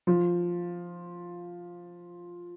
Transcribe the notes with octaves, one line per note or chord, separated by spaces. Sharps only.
F3